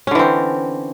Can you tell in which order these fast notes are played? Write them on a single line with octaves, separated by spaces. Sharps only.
C#4 D3 E3 C4